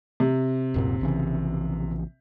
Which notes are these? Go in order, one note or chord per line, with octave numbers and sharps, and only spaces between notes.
C3
D1 F#2 A#2
A#1 C#3 E3